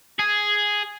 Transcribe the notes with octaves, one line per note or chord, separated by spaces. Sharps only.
G#4